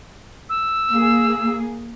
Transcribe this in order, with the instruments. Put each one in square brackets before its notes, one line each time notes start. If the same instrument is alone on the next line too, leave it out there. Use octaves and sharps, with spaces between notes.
[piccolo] E6
[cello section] A#3 G#4